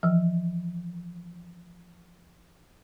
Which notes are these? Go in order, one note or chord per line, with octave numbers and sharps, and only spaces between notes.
E3 F3